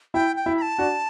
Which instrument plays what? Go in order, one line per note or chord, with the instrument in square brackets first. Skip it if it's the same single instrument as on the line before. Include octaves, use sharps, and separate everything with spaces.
[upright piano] E4 [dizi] G5
[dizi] G5
[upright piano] E4
[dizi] B5
A5
[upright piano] D4 F#4